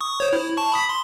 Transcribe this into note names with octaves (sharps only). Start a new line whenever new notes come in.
C#6 D#6
C5 C#5
E4
A5 C#6
B5 D#6 B6
C6